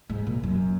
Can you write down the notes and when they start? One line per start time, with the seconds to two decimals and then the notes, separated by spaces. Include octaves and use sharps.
0.09 G#2
0.27 A#2
0.43 F#2